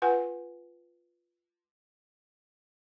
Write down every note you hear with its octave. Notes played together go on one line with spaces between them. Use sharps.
F4 B4 F#5 G#5